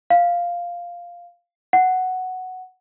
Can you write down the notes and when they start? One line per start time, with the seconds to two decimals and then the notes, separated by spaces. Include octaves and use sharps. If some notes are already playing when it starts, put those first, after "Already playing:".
0.10 F5
1.73 F#5